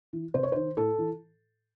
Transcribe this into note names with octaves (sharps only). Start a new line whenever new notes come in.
E3
C3 C5
C#5
D#3 C5
A2 A4
E3